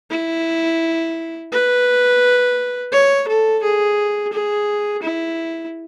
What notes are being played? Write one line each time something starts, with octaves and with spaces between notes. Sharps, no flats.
E4
B4
C#5
A4
G#4
G#4
E4